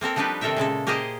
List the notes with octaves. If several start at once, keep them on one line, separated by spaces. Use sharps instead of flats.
A#3 C4 A4 A#4
F3 G3 D4 D#4 G4 B4
C3 D#3 A4 A#4 E5 G5
A#2 C#3 G#3 A4
A#3 G4 G#4 A#4 C5 D#5